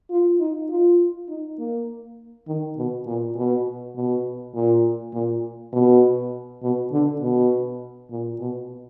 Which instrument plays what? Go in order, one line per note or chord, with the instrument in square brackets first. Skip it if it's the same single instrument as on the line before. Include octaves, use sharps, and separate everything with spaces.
[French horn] F4
D#4
F4
D#4
A#3
D#3
B2
A#2
B2
B2
A#2
A#2
B2
B2
D3
B2
A#2
B2